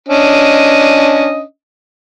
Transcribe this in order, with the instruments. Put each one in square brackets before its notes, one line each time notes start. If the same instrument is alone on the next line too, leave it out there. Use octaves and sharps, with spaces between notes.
[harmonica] C#4 D4 D#5